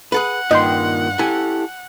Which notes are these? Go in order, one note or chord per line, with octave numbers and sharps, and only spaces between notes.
G#4 A4 B4 F#5
G2 A#2 D#3 D#5 G5 C6
E4 G4 A4 G#5